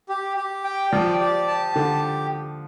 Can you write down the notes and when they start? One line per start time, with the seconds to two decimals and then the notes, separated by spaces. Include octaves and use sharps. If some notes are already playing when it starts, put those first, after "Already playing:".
0.09 G4
0.37 G4
0.64 G5
0.92 F3 D5
1.21 G4
1.48 A5
1.75 D3 G4